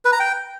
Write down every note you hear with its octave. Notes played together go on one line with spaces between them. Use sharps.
B4
A#5
G5